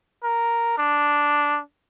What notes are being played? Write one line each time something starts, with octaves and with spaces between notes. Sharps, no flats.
A#4
D4